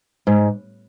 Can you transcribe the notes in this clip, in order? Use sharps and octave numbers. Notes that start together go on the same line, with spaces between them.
G#2